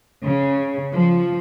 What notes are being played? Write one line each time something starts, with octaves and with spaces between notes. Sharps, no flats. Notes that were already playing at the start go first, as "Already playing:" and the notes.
C#3
F3